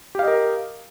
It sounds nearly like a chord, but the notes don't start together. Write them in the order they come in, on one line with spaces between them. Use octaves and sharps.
G4 F5 D#5 A#4